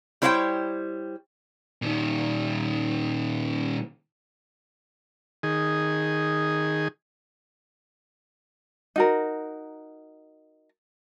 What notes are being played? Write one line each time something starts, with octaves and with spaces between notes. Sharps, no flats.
G3 E4 C5 C#5 F5 G5
A#2 D#3
D#3 G#4
D#4 F#4 A#4